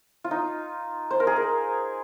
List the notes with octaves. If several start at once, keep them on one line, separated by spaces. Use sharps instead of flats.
F4
D#4
C5
A#4
G#4
A#4